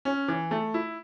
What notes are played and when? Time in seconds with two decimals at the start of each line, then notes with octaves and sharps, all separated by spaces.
0.05 C#4
0.28 E3
0.51 A3
0.74 E4